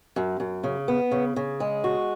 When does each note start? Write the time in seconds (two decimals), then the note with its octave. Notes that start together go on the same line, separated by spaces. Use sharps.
0.16 F#2
0.40 F#2
0.64 C#3
0.88 B3
1.11 C#3
1.36 C#3
1.60 G#3
1.84 F#4